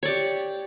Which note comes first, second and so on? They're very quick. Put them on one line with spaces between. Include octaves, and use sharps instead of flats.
C#5 D5 G4